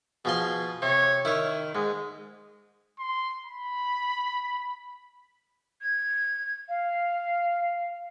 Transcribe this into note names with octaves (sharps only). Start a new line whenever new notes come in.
B2 F3 G#4 C6
C3 C#5
D#3 E4 C#5
G#2 G#3
C6
B5
G#6
F5